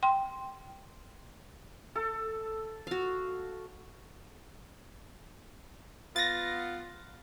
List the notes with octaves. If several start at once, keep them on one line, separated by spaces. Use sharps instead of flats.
G5 C6
A4
F#4 F5
B3 F4 A6 A#6